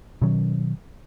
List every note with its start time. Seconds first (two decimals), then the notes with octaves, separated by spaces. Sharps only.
0.22 B2 D#3 F#3 C#4